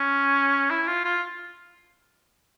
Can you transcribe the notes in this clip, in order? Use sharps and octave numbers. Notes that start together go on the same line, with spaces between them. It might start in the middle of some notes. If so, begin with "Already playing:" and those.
Already playing: C#4
E4
F4
F4